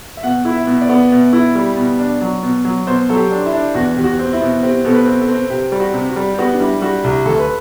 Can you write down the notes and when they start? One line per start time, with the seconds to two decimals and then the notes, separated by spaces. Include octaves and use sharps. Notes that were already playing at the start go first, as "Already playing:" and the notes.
0.17 E5
0.23 B2 F#5
0.45 E4
0.52 E5
0.67 B2
0.81 D5
0.89 B3
1.12 B2
1.33 E4
1.55 G3
1.77 B2
1.99 D4
2.21 F#3
2.43 B2
2.65 F#3
2.87 B2 C5
3.09 F#3 A4
3.16 G4
3.31 D4
3.46 E4
3.53 D4
3.75 E2 F#4
3.96 E2 G4
4.04 F#4
4.19 C4
4.33 E4
4.41 B2
4.63 C4 G4
4.85 B2 A4
4.92 B4
5.06 C4
5.21 A4
5.28 C4
5.50 C3 G4
5.72 G3
5.80 F#4
5.94 C3
6.09 F#4
6.16 G3
6.34 G4
6.39 B3 F#4
6.54 D4
6.60 G3 E4
6.82 G3 F#4
7.04 C2 G4
7.26 D2 A4
7.38 B4